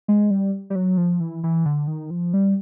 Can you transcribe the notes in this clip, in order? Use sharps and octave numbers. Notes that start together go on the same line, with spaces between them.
G#3
G3
G3
F#3
F3
E3
E3
D3
D#3
F3
G3